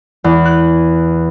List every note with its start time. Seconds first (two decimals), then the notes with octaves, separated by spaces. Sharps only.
0.24 E2
0.45 F#6